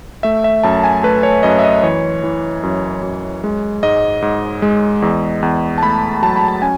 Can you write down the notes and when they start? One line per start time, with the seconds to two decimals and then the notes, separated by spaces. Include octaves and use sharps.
0.23 A3 E5
0.44 E5
0.63 F#2 A5
0.84 G#5
1.03 A3 B4
1.23 C#5
1.43 F#2 D#5
1.59 E5
1.64 D#5
1.83 E3 C#5
2.24 E3
2.63 F#2
3.03 F#2
3.44 G#3
3.83 G#2 D#5
4.22 G#2
4.62 G#3
5.02 E2
5.43 E2
5.78 A5
5.83 A3 B5
6.22 F#3 A5
6.36 B5
6.48 A5
6.62 C#4 G#5